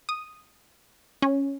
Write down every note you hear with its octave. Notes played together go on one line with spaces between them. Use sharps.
D#6
C#4